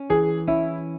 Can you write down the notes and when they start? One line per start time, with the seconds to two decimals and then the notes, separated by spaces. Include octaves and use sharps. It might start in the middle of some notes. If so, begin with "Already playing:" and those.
Already playing: C#4
0.10 E3 G#4
0.48 C#4 E4